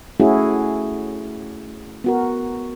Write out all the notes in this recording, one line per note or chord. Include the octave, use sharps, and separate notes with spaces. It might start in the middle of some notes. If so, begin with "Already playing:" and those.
A3 C#4 E4 F#4 G#4
B3 F#4 A#4